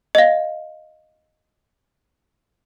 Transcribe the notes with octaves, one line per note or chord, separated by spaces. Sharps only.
D#5 F5